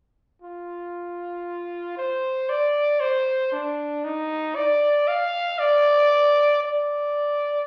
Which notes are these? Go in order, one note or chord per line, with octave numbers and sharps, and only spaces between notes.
F4
C5
D5
C5
D4
D#4
D5
F5
D5
D5